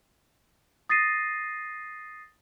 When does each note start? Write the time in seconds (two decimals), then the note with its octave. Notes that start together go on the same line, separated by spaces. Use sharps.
0.89 D#6 A6 A#6 C7 D#7